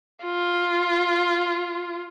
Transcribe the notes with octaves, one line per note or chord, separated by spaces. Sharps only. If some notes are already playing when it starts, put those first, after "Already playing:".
F4